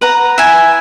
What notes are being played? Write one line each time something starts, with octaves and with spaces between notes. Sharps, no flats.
B4 F#5 A#5
E4 E5 G#5